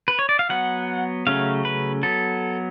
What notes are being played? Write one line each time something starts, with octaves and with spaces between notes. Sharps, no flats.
B4
C#5
D5
F5
F#3 B3 F#5
C#3 F#3 A3 C#4 F5
B4
F#3 B3 A4